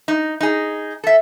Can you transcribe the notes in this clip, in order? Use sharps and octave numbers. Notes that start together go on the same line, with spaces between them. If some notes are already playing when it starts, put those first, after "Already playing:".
D#4
D#4 G#4
A4 E5